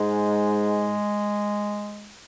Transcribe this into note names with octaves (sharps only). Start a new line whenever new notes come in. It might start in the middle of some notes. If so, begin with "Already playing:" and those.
Already playing: G#2 G#3